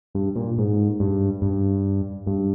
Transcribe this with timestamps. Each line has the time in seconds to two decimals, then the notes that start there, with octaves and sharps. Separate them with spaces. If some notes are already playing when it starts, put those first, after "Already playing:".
0.15 G2
0.36 A#2
0.58 G#2
1.00 G2
1.42 G2
2.27 G2